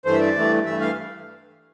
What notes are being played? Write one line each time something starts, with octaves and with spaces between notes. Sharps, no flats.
G2 E3 A3 C5
E5
D5
G2 E3 A3
G2 E3 A3 E5
F5